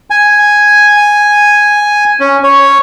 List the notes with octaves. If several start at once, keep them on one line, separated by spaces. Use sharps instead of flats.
G#5
C#4
C#5